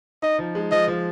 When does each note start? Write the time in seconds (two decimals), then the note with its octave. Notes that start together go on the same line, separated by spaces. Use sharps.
0.22 D#4 D#5
0.38 F3
0.55 G#3
0.72 F3 D#5
0.88 F3